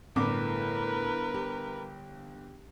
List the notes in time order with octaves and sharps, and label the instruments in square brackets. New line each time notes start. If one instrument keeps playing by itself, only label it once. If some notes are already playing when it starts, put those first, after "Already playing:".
[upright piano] G1 D6 [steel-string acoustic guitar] A2 [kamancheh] A#4 B4
[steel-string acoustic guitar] G4